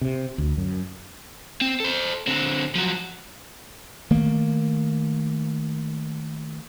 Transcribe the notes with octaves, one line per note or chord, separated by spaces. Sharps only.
C3
D2
F#2
C4
A4 C5
D3 C4
F3 F#3
D#3 A3 A#3